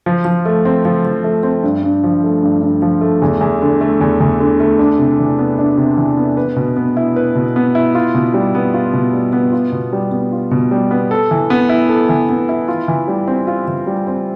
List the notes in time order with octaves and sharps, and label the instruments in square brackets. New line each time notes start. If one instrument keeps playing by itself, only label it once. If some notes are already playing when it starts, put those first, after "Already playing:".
[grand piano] F3
F3
A3
C4
F3
F3
A3
C4
G2
G2
F3
A3
G2
G2
F3
A3
E2
E2
D3
A3
E2
E2
D3
A3
D4
C3
E3
B3
D4
C3
E3
B3
B4
B2
B3
E4
B4
B2
B3
E4
F4
B2
G3
B3
F4
B2
G3
B3
F4
B2
G3
B3
F4
B2
G3
B3
A4
E3
B3
E4
A4
E3
B3
E4
F4
E3
G3
C4
F4
E3
G3
C4